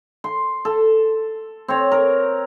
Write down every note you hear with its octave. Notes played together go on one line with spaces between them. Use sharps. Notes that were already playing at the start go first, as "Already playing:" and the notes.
C6
A4
C4 C#5
A#4